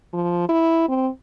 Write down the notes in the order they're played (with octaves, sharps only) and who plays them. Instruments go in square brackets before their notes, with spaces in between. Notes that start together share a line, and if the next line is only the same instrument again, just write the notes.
[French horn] F3
E4
C4